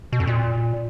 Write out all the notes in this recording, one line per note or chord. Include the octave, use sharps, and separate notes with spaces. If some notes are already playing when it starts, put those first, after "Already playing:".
B2
F2
A#2